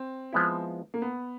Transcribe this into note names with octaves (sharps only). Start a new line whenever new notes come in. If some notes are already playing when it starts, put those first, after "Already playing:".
Already playing: C4
F3 G#3 B3 E4
A#3
B3